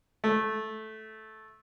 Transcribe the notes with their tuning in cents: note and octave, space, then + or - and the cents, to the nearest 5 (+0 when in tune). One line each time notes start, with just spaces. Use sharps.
A3 -10